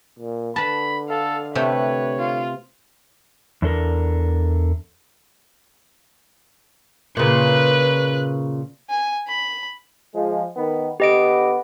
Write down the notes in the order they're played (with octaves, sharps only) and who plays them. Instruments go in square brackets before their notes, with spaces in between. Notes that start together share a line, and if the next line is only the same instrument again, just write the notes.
[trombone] A#2
[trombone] D3 [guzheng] B4 A5 [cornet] B5
[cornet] A4 [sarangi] F5
[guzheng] C3 A3 G5 [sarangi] B4 [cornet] C#5
[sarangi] F4
[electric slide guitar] E2 D4 A4 A#4
[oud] A#2 C#3 [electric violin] B4 F#6
[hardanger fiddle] G#5
B5
[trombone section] F3 G#3
D#3 B3
[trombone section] D3 B3 [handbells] G4 D#5 D7